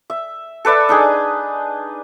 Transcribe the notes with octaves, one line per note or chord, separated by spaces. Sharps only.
E5
A4 B4 D5 E5
D4 D#4 G#4